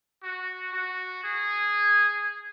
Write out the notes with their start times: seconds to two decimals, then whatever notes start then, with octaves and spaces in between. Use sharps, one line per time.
0.23 F#4
0.73 F#4
1.24 G#4